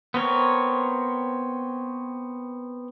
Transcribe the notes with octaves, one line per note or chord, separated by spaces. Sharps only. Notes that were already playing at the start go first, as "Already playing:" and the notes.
B3 C4 A#4 C#5